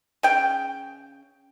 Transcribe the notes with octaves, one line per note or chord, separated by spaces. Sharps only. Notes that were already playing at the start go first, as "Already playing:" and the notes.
C#3 G5